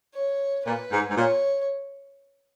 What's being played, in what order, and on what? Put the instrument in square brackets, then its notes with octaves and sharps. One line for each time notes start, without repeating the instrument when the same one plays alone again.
[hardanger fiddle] C#5
[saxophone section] A#2 [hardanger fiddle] B4
[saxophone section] G#2
G#2
[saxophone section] A#2 [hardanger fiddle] C#5